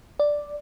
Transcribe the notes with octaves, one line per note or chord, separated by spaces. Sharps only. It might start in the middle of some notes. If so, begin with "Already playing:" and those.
D5